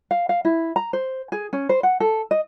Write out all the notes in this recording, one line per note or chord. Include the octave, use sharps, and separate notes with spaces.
F5
F5
E4
A#5
C5
G#4
C#4
C5
F#5
A4
D#5